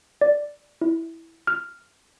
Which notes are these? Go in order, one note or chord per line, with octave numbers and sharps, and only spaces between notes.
D5
E4
F6